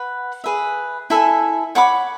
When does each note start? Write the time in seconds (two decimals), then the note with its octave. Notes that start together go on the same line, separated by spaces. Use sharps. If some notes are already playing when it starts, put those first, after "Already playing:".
Already playing: B4 F#5
0.44 G#4 B4 E5
1.10 E4 A4 E5 G#5
1.75 C#5 F#5 B5 D6